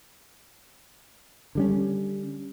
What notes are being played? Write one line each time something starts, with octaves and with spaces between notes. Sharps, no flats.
D3 G3 C#4